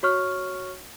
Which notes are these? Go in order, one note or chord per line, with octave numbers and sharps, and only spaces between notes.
F#4 C#5 C#6 F6